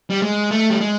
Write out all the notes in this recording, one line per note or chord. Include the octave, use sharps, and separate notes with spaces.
G3
G#3
A3
G3
G#3